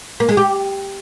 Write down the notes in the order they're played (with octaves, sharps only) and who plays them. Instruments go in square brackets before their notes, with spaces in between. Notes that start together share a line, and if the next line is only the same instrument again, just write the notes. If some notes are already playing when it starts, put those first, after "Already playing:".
[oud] A#3
G#3
G4